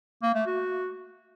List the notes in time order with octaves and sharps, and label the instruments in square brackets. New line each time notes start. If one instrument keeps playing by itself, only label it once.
[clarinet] A#3
A3
F#4